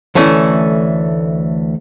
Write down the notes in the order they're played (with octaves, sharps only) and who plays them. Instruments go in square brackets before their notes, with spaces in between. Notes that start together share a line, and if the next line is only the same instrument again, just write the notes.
[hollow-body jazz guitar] D2 E3 A3 C#4